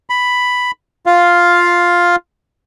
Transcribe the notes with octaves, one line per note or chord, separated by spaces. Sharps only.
B5
F4 F5